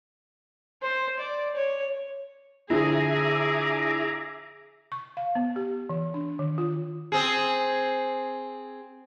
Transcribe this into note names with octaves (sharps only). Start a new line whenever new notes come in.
C5
D5
C#5
D3 F3 E4 G#4 E5 A#5 D6
C#6
F5
B3
G4
E3
D4
D#3
F4
C4 G#4